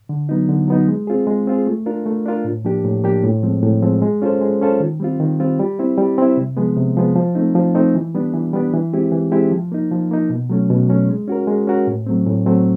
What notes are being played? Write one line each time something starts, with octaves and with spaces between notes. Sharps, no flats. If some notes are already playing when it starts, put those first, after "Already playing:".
D3
F#3 B3 D#4
D3
F#3 B3 D#4
G#3
C4 F4 G#4
G#3
C4 F4 G#4
A3
D4 F4 A#4
A3
D4 F4 A#4
A2
F3 A#3 D4 G4
A2
F3 A#3 D4 G4
A2
F3 G#3 C4
A2
F3 G#3 C4
G#3
C#4 F4 A4 C5
G#3
C#4 F4 A4 C5
D#3
G3 C4 F4
D#3
G3 C4 F4
G3
C4 E4
G3
C4 E4
C3
F3 G#3 B3
C3
F3 G#3 B3
F3
A3 C4 D#4
F3
A3 C4 D#4
E3
G3 B3 D4
E3
G3 B3 D4
E3
G#3 C4 E4 G4
E3
G#3 C4 E4 G4
F3
A#3 D#4
F3
A#3 D#4
B2
F#3 A3 C#4
B2
F#3 A3 C#4
G#3
C#4 F#4 A#4
G#3
C#4 F#4 A#4
A2
F#3 A3 C4
A2
F#3 A3 C4